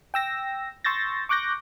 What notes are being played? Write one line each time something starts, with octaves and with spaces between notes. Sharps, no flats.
G5 E6 A#6
C6 C#6 E6 G6 A6 A#6
C#6 D6 F#6 G6 A#6